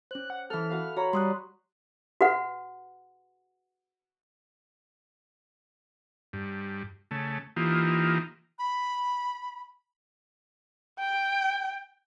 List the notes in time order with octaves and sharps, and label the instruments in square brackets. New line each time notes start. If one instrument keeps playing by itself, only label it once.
[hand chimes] C#4 C5 [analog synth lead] F#6
[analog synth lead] F#5
[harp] E3 A4 [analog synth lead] F6
[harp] F#4 B4 F5
[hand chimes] F#4 [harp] C#5 A#5 B5
[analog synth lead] G3 [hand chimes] C6 D#6 F#6
[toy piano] F#4 B4 F#5
[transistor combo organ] G2
C#3 A3
E3 A#3 D#4 F4 G4
[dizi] B5
[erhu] G5